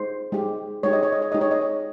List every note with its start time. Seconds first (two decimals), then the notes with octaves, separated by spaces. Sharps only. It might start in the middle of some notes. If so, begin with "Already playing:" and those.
Already playing: G#3 D#4 G4 C5
0.32 G#3 D#4 G4
0.83 G#3 D#4 G4 C#5
0.93 D#5
1.03 C#5
1.12 D#5
1.22 C#5
1.32 G#3 D#4 G4 D#5
1.41 C#5
1.51 D#5
1.61 C#5